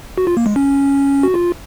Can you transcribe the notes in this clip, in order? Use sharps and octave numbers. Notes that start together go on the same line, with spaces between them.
F#4
F4
A#3
G#3
C#4
F#4
F4